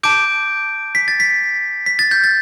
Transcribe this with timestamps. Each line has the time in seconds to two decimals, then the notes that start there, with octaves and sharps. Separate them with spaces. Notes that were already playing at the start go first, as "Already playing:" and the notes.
0.03 A5 D6 G6 D7
0.95 B6
1.08 A6
1.20 B6
1.86 B6
1.99 A6
2.11 G6
2.24 A6